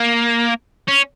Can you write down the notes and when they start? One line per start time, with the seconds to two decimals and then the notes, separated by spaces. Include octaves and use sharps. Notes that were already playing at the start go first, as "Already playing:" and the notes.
Already playing: A#3
0.88 C#4